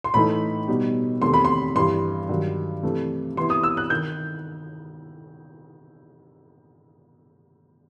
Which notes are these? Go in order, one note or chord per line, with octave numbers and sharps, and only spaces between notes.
C6
A2 E3 A3 D#4 B5
B2 G3 D#4
E2 C3 D#3 A3 C4 C6
B5
C6
G2 E3 G3 C6
G2 D#3 F#3
C3 E3 A3
C3 E3 B3 E4 C6
D#6
E6
F#6
D#3 G6